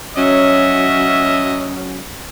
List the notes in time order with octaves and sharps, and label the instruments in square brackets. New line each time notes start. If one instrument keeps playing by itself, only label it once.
[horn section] F#3 C#4 [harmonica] D#5 E5